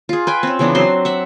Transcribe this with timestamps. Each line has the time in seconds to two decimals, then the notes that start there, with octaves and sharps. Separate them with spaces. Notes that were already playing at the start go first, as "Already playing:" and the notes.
0.09 F4 G#4
0.27 B4 G5 G#5
0.43 C4 C#4
0.59 C#3 E3 B3 D4
0.75 F#3 C4 C5 C6
1.05 E5 F#5